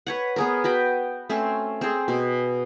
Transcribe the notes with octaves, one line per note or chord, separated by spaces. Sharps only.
B4 C#5 F#5
B3 G#4 A#4
F#4 B4 G5
A3 C4 C#4
C4 G#4
B2